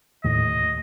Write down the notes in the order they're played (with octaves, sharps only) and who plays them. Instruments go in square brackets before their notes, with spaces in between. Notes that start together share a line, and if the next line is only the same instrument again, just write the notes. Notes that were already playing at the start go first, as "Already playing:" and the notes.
[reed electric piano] D#2 A2 [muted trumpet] D#5